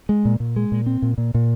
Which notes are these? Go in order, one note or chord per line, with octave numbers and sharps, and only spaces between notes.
G#3
A#2
A#2
G#3
A#2
C4
A#2
A#2
A#2